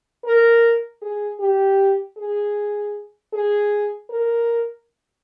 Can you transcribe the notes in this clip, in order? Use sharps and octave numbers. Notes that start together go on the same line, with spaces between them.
A#4
G#4
G4
G#4
G#4
A#4